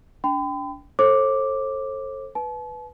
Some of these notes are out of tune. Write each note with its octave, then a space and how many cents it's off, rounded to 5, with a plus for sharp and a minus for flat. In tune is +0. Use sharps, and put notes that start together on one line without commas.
D4 -35 G5 +0 B5 +45
A4 +0 C5 +40 D6 +0
B4 +0 A5 -40